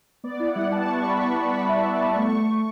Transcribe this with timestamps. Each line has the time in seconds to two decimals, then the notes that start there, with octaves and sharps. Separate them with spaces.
0.24 B3 D5
0.40 E4
0.48 F#5
0.55 G3
0.72 E4 A5
0.87 G3 C#6
1.04 G3 B5
1.19 G3 C#6
1.36 E4 C#6
1.43 B5
1.53 G3
1.68 B3 E5
1.85 G3
2.00 B3
2.16 A3 C#6